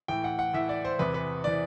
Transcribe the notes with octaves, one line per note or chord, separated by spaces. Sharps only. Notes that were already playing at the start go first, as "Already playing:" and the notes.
A2 E3 G5
F#5
F#5
A2 E3 E5
D5
C5
E2 C3 E3 B4
B4
C3 E3 D5